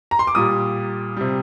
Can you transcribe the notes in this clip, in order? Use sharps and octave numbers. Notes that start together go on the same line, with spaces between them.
A#5
C6
D6
A#2 G3 D#6
C3 G3